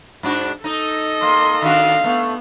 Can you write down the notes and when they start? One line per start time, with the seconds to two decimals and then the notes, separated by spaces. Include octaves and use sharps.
0.23 G#2 D4 F#4
0.64 D#4 A4 D#5
1.22 A#3 C6
1.62 D#3 D4 F#4 F5
2.04 A3 B3